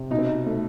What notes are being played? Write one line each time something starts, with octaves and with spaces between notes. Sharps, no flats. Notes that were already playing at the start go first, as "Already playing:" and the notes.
Already playing: C3
B2 D#4
C4
D#4
A3